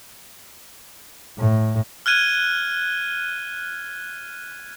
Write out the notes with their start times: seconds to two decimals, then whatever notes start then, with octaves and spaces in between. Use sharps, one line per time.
1.38 A2
2.06 F6 F#6 G#6 D#7 G7